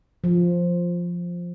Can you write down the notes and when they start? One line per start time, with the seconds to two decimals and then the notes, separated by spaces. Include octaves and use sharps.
0.24 F3